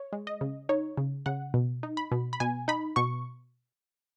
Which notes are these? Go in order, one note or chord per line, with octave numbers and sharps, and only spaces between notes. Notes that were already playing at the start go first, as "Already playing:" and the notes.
Already playing: C#5
G#3
D#5
C#3
D#4 C#5
C#3
C#3 F#5
B2
D#4
B5
B2
B5
B2 G#5
D#4 B5
B2 C#6